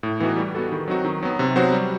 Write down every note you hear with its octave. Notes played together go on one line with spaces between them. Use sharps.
A2
E3 B3 D#4 F#4
G3
B3 F#4 A4
D#3
F#3 C4 D#4 F#4
D#3
F#3 B3
C3
F#3 B3 F#4 C5
G3